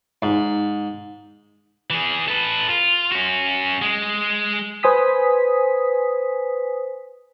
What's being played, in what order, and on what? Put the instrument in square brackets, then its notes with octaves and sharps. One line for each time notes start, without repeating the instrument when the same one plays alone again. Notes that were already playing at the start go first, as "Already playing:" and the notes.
[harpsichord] G#2
[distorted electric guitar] E3 G#4
A4 B4
F4
C#4 F#4
G#3
[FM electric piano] B4 C5 G#5 D#6 B6